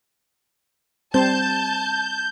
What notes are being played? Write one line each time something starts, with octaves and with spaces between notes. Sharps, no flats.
G3 C4 C5 A5 G6